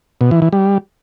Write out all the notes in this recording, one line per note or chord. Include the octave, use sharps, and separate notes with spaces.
B2
E3
E3
G3